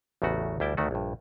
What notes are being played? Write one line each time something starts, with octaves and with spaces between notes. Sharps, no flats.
A1 E2 C#3 A3 F#4
D2 G3 E4 G5 A5
D2 D#3 A3 F#4
A#1 G2